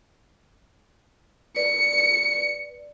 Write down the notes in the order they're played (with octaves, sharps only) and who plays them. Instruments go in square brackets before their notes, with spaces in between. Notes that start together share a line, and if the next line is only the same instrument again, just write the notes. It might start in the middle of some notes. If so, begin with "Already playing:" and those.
[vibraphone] B4 D5 [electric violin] C#7